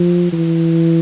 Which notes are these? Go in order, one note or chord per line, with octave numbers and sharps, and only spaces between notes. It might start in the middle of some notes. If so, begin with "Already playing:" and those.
Already playing: F3
E3